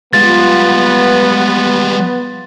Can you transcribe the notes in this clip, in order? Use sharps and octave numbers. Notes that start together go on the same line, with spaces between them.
G3 G#3 B3 F4 A6